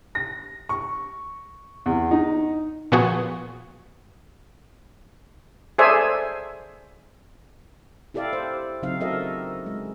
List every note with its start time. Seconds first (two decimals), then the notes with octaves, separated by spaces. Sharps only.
0.15 A#6
0.69 C#6
1.86 E2
2.11 D#4
2.92 A#2 F3 B3 F#4 G#4
5.78 G#4 A4 C5 D5 E5 G#5
8.14 E4 G4 A4 D5 E5 F5
8.33 C5
8.83 C#3 F#3 C4 D#4 F5
9.01 F#4 A4 A#4 D#5 E5
9.66 G#3